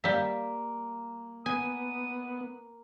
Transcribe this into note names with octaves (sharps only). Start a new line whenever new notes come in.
G3 A#3 E5
B3 G#5 D#6